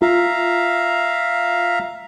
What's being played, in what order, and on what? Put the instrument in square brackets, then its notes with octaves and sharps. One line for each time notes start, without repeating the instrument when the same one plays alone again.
[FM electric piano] F4 [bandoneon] E5 F5 A#5